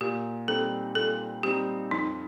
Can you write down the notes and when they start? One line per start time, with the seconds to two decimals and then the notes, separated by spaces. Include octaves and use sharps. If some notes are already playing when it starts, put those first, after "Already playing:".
0.01 A#2 G4
0.48 G3 C4 D#4 A4
0.95 A#2 A4
1.43 G3 C4 D#4 G4
1.91 F2 D#4